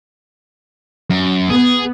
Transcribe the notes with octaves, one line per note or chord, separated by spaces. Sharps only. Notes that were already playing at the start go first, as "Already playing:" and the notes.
F#2
B3 G#4